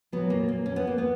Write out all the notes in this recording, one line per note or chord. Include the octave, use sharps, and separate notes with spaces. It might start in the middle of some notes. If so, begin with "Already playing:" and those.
A#2 F#3 B3
A#3
A#3
C#4
B3
A#3
B3